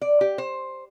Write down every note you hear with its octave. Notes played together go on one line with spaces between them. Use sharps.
D5
G4
C5